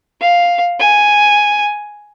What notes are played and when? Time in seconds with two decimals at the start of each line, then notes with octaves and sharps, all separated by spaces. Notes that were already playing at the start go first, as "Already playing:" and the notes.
0.21 F5
0.79 G#5